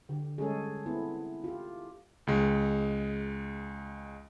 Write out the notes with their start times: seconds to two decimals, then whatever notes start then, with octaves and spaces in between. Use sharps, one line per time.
0.09 D3 G4
0.38 G3 G#3 C#4 G#4 A4
0.86 B3 C4 E4 A4
1.44 E4 F4 G4
2.27 C#2 G#3